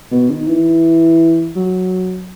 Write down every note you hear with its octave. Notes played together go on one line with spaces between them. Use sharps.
B2
D#3
E3
F#3